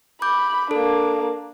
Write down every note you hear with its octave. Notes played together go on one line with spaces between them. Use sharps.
B5 D6 G6
A#3 D4 A4